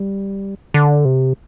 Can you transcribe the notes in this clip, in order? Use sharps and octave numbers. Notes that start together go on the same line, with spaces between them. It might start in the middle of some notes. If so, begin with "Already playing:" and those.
Already playing: G3
D3
C3